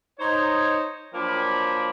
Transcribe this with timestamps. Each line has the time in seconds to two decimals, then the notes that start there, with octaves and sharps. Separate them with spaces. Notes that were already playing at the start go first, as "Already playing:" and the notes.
0.19 D#4 C5 C#5
1.13 F3 F#3 A#3 D4 G5 B5